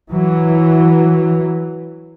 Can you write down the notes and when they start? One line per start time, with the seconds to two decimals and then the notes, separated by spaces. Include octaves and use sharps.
0.11 E3 F#3